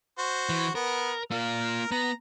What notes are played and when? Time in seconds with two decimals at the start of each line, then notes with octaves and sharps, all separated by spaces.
0.19 F#4 C5
0.49 E3
0.75 B3 A#4
1.31 A#3 F4 A#4
1.91 B3 A#5